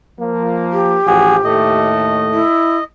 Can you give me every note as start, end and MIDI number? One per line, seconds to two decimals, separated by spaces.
0.20 0.98 53
0.20 0.98 58
0.72 1.88 67
1.07 1.38 33
1.07 1.38 53
1.07 1.36 66
1.07 1.36 68
1.44 2.42 39
1.44 2.42 45
1.44 2.42 57
1.44 2.84 75
2.33 2.78 64